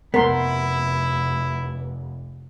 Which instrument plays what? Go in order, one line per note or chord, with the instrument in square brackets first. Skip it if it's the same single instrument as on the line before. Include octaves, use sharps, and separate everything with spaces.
[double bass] F1 [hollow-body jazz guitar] B3 [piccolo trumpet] E4 [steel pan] A#4 C6